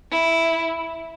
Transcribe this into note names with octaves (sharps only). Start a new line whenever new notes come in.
E4